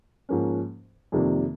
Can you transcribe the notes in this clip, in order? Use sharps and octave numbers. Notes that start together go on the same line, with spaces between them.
G#2 F3 A#3 C#4
F2 C3 D#3 G3 A#3